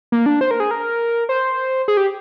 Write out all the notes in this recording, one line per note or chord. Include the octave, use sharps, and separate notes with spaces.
A#3
D4
C5
A#4
G#4
A#4
C5
G#4
G4